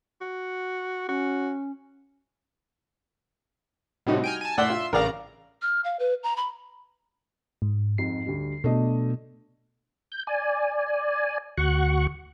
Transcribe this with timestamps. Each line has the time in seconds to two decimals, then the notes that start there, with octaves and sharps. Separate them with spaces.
0.21 F#4
1.08 C#4 F#4
4.06 A2 C3 G3 D#4 F#4
4.24 G5 G#5 F6
4.41 G#5 A5
4.58 A2 D5 E5 F#5 C6 E6
4.70 F4
4.93 A1 C#3 A#4 D5 F5 A#5
5.62 F6
5.84 F5
5.99 B4
6.23 A#5
6.37 B5
7.62 G#2
7.98 F2 G#2 C7
8.26 D2 G3
8.64 B2 A3 D4 D#5
10.12 G6
10.27 D5 G#5
11.57 D2 F#4 C#6 F#6